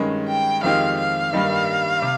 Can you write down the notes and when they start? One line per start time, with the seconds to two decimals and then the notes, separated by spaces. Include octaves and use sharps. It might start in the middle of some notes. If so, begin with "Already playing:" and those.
Already playing: G2 D#3 G#3 C#4
0.28 G5
0.63 F2 D#3 G#3 C4 G4 F5
0.98 F5
1.33 G2 D#3 G3 A#3 D#4
2.02 C3